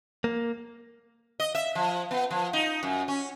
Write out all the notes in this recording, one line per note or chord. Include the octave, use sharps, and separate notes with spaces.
A#3
D#5
E5
F3
B3
F3
D#4
F#2
C#4